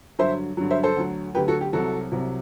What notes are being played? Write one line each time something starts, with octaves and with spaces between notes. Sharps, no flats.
G2 D3 F#3 C5 E5
G2 D3 F#3
C5 E5
A4 C5
D2 D3 F#3
D2 D3 F#3 G4 B4
F#4 A4
G4
C2 C3 F#3 F#4 A4
C2 C3 F#3